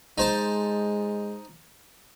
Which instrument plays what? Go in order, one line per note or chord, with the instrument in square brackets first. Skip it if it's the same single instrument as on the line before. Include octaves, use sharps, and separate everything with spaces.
[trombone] G#3 [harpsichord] D#4 C5 A5